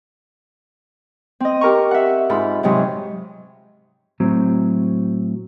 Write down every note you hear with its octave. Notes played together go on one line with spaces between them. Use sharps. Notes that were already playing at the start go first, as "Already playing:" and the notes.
C4 D#5
G4 A#4 A#5 C#6
E5 F#5
G#2 F4 B5
G#2 C3 F#3 G#3
A2 F#3 C4